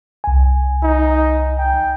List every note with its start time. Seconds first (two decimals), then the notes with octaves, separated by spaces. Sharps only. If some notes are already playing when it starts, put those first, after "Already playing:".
0.24 C2 G#5
0.83 D#4
1.58 G5